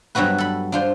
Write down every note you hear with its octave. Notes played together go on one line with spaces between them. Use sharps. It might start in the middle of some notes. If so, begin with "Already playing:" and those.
G2 F#3 B3 F#4 B4
A4 B5
D4 F4 C5